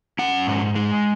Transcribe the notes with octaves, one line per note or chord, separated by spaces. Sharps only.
C#4 F#5
G#2
G#3